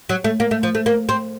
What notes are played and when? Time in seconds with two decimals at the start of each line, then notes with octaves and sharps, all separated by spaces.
0.09 F#3
0.24 A3
0.40 A#3
0.51 A3
0.63 F3
0.75 A3
0.86 A#3
1.09 C4